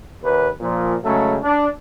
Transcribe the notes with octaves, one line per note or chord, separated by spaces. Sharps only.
D#2 B4
A#2 F3
C#3 F#3 G#3 A3
D4